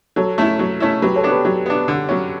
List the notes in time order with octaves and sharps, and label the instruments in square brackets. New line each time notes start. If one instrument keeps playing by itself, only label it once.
[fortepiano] F#3 [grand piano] A4 C#5
[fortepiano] A3 C#4 E4
F#3
A3 C#4 E4
[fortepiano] F#3 [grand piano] G4 B4
[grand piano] A4 C#5
[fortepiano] B3 D4
[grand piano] G4 B4
[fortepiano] F#3
B3 D4
D3
F#3 C#4